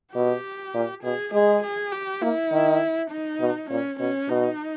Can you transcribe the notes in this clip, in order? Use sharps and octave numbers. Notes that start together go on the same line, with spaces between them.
B2 G4
A#2
B2 G#4
G#3 G#4
G#4
G4
A#3 E4
D#3
D#4
B2
A#2 C#4
B2 C#4
B2 D#4